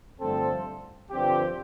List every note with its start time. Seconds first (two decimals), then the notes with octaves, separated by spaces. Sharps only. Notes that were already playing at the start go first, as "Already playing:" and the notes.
0.19 G2 D3 F3 A3 C4 A4
1.10 G2 D3 F3 C4 G4